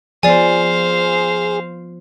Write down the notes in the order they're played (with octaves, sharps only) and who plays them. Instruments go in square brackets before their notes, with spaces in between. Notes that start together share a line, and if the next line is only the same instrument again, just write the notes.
[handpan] F3 B3 [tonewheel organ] G#4 [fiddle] C5 F5 [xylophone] D5 G#5